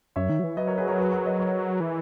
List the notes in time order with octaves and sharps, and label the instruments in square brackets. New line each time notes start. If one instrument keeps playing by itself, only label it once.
[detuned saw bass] F#2 [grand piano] C#5 E5
[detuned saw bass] D#3
F#3
E3
[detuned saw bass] F#3 [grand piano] B4 D#5
[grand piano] A#4 C#5
G#4 B4
A#4 C#5
G#4 B4
A#4 C#5
B4 D#5
A#4 C#5
[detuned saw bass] E3